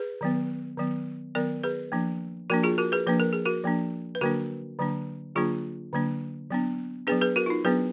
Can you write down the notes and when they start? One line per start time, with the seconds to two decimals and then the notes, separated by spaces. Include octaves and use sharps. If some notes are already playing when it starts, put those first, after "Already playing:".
Already playing: G#4 B4
0.21 D#3 F#3 B3
0.77 D#3 F#3 B3
1.35 D#3 F#3 B3 A#4 D5
1.64 G#4 B4
1.92 F3 A#3 D4
2.50 F3 A#3 D4 F#4 A#4
2.63 F4 G#4
2.78 F#4 A#4
2.92 G#4 B4
3.07 F3 A#3 D4 B4
3.20 A#4
3.33 G#4
3.45 F#4 A#4
3.64 F3 A#3 D4
4.15 B4
4.21 D3 F#3 A#3 D4 F#4 A#4
4.79 D3 F#3 A#3 D4
5.36 D3 F#3 A#3 D4 F4 G#4
5.93 D3 F#3 A#3 D4
6.50 F#3 B3 D4
7.07 F#3 B3 D4 G#4 B4
7.21 G#4 B4
7.36 F#4 A#4
7.46 F4
7.50 D#4
7.65 F#3 B3 D4 G#4 B4